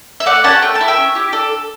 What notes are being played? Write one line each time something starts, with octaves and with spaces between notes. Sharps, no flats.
E5
A3 D5 F#5
C#4 G4 F#5 A5
A3 G5
A5
E4 A4
E5 G5
C#4
E4 G4
D4 A4
A4